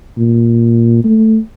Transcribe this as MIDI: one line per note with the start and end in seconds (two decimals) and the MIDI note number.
0.18 1.03 46
1.05 1.38 57